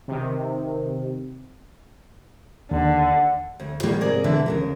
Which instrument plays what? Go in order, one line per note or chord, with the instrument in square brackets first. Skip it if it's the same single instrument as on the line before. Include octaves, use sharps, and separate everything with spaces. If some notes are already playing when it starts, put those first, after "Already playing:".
[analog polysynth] C3 D#3
[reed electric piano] D#2 [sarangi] D3
[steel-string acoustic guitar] D2
A#2 D#3 G3 A#3 F#4
G#2 C3 G#4 A#4 D5
D2 B2 D3 E3 E5
D#2 C#3 A#4